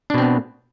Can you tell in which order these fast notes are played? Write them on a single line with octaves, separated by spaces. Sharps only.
D4 B2 C4 B3